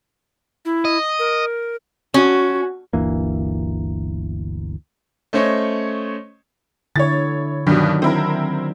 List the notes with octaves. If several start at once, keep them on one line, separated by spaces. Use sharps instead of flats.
E4
D#5
A#4
C#4 F#4
G1 D2 E3 A#3
A3 C#4 C5 C#5 D#5
D3 E4 C#5 A6
G2 B2 D#3 F#3 D4
C4 E4 A#4